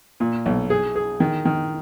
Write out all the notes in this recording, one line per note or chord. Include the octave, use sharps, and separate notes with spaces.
A#2
B1
G#4
G#4
D#3
D#3